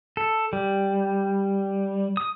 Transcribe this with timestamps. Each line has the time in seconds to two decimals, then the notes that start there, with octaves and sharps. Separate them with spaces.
0.17 A4
0.53 G3
2.17 D#6